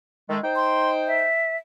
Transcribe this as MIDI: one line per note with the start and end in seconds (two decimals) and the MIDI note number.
0.29 0.38 51
0.29 0.38 56
0.29 0.38 57
0.43 1.27 63
0.43 1.27 72
0.43 1.27 79
0.56 0.91 84
1.07 1.57 76